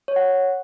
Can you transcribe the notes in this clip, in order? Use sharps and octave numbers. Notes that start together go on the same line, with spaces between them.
C#5
F#5